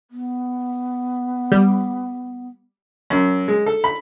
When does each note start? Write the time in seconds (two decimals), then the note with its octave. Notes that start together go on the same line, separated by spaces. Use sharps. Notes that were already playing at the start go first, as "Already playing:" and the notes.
0.11 B3
1.52 G3
3.10 F#2
3.48 G#3
3.66 A4
3.84 B5